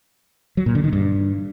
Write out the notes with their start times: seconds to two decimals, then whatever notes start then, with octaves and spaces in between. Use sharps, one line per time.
0.57 F#3
0.66 A#2
0.75 D3
0.84 D#3
0.93 G2